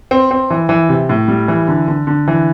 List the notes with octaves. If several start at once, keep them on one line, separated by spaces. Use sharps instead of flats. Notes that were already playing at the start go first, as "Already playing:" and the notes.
C4
C4
E3
E3
C3
A2
G3
E3
D3
D3
D3
E3